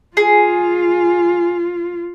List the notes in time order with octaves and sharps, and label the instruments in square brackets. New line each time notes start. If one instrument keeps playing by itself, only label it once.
[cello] F4 [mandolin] G#4